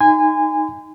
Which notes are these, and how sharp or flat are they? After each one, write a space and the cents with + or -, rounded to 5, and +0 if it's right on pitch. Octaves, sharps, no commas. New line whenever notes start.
D#4 +0 G#5 -20 C6 -40